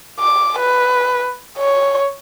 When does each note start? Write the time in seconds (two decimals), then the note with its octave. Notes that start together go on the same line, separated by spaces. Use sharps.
0.20 D6
0.60 B4
1.58 C#5